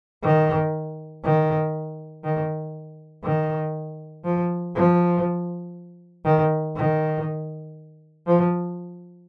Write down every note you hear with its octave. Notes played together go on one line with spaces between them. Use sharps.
D#3
D#3
D#3
D#3
F3
F3
D#3
D#3
F3